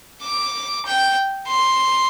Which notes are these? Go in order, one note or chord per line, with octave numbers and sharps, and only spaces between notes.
D6
G5
C6